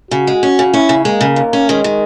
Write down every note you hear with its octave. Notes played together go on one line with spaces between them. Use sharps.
C#3 F#4
G#3
C#4
C#3
C#4 E4
C#3
G#3 A#3
C#3
D#2
C#4
D#3 G#3
D#3